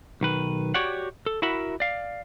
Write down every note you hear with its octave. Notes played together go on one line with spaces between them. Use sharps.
B1 D#3 B4
F#4 G4 C#5 D5 F#5
A4
E4 F#4 A#4 E5 F#5 B5
D5 F5